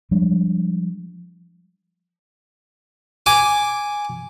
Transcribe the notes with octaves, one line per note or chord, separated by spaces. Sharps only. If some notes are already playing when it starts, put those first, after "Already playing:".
F3 G3 G#3 D4
G#5 D6